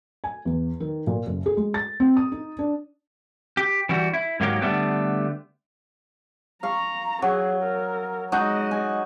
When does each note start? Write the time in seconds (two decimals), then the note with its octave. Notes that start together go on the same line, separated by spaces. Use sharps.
0.24 G#5
0.45 E2
0.80 D#3
1.07 A#2
1.27 F#1
1.46 G#4
1.57 G#3
1.74 A6
2.00 C4
2.17 D#6
2.32 D#4
2.59 D4
3.57 G4
3.89 E3 G3 F#4
4.13 E4
4.40 G#2 D#3 F#3 A#3 G4
4.61 D3 G3 A3 B3
6.63 F5 A#5 C#6
7.22 F#3 G#4
7.63 A#4
8.32 G#3 D#4 F#4 D#5
8.71 G#5